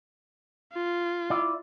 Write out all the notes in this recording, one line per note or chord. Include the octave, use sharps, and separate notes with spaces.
F4
E4 D5